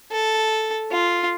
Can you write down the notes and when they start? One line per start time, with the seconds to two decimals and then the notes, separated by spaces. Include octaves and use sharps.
0.12 A4
0.91 F4